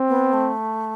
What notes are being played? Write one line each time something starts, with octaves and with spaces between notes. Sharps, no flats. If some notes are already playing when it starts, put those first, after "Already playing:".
Already playing: C4
B3
A3